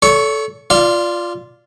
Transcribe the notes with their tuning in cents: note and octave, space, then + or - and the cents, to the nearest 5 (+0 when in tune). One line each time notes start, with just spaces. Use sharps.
A4 -10 C#5 +45 C#6 +0
F4 +0 D5 +0 F5 -35